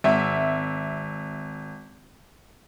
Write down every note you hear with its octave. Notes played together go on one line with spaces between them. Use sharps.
G#1 E5